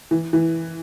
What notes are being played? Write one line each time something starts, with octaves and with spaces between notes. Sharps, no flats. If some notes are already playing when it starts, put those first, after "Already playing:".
E3
E3